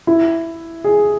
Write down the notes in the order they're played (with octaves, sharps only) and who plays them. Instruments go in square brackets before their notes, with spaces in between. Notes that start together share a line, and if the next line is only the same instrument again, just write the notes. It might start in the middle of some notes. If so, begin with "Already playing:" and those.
[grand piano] E4
G#4